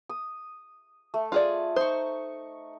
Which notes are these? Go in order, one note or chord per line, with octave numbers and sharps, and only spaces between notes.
D#6
A3
F4 G#4 D5
D#4 C5 C#6